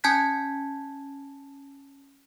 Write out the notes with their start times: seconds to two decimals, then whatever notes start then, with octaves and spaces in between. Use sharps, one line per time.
0.04 C#4 G#5 A5 G6 G#6 B6